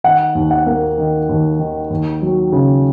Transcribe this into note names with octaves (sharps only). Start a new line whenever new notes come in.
D#3 F#5
D#2
F#5
A#3
D#3
D#2
D#3
D#2
F#3
C#3